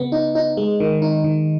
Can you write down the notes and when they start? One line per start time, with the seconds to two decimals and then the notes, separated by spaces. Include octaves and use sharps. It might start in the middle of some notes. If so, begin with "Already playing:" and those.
Already playing: C#3 B3
0.12 D#4
0.35 D#4
0.57 G#3
0.80 D#3
1.02 D#4
1.24 D#3